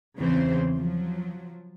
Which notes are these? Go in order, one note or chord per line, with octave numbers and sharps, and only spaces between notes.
E2 C#3 E3 C4 C5
F3 F#3